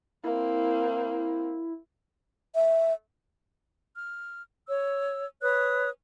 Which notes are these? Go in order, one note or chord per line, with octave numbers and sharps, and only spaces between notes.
A#3 C4 E4
E5
F6
C#5 E6
B4 C#5 D#6 F#6